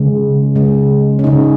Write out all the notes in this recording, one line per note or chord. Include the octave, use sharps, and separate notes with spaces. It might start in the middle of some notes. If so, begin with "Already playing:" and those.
Already playing: C#3 G#3
C#3 G#3
C#4
C#3 G#3 D#4